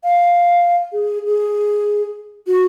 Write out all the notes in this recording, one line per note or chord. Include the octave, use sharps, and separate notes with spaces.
F5
G#4
G#4
F#4